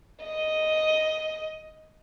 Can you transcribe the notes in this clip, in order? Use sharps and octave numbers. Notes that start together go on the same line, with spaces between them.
D#5